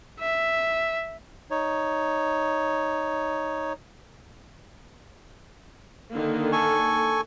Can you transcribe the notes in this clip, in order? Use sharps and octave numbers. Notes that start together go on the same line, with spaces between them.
E5
D#4 C#5
D3 D#3 A#3
A4 G#5 C#6